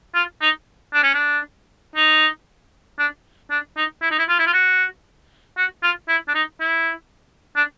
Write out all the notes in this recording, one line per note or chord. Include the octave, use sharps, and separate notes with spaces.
F4
D#4
D4
C#4
D4
D#4
D4
D4
D#4
E4
D#4
E4
F4
E4
F4
F#4
F#4
F4
E4
D4
D#4
E4
D4